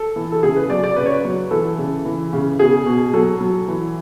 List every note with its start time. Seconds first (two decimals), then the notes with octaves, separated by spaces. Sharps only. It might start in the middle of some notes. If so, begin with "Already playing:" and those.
Already playing: A4
0.16 E3
0.32 A4
0.43 C#3 G#4
0.56 B4
0.70 F#3 D5
0.84 D5
0.96 C#3 B4
1.06 C#5
1.14 B4
1.25 F#3
1.51 E3 A4
1.78 C#3
2.05 E3
2.33 C#3
2.59 B2 G#4
2.86 B2
3.14 F#3 A4
3.41 F#3
3.68 E3